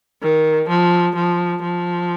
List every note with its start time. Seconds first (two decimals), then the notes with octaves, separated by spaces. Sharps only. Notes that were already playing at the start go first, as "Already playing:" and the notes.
0.23 D#3
0.69 F3
1.16 F3
1.63 F3